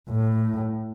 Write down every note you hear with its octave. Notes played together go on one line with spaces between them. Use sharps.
A2